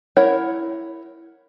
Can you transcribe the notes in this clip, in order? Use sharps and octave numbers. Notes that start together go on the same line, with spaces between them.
E4 A#4 C#5 F#5